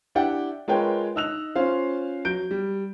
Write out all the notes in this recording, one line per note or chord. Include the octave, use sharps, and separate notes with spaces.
D4 E4 G4 D5 F#5 G5
G#3 F4 A#4 B4 C#5 G5
D#4 D#5 E6 F#6 F7
C#4 F4 C5 F5
F#3 G6 D7
G3